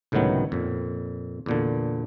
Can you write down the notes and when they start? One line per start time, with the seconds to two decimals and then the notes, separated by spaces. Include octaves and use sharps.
0.12 C#2 A2 C3 D#3 F#3 B3
0.52 F2 A#2
1.46 E2 A#2 D3